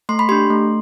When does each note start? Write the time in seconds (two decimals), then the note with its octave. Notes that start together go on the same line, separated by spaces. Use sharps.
0.09 A3 C6
0.19 B5
0.29 D4 G4 C6
0.50 A3